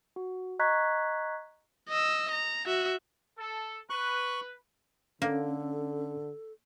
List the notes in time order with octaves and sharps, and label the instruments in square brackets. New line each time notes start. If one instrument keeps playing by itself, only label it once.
[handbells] F#4
D#5 A#5 C#6 F#6 G#6 B6
[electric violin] D#5 E6
A#5
F#4 E5
[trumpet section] A4
[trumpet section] B4 [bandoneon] C#6 F#6
[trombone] D3 [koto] A#3 [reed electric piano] C#4 [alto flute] A4